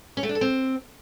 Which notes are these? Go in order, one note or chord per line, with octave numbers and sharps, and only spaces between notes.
C#4
A3
D4
A4
C4